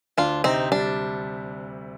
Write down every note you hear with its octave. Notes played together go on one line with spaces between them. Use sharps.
D2 D4 F4
C3 C4 D#4
G3 D4